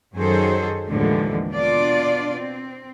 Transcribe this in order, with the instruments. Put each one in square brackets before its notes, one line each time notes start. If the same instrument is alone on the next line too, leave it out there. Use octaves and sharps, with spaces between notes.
[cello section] F#2 D#3 F#3 G#4 A4 C5
D#2 A2 D3 E3 F3 G#3
B2 D4 F4 D5
C4